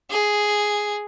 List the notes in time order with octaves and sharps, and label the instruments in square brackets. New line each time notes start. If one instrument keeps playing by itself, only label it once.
[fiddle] G#4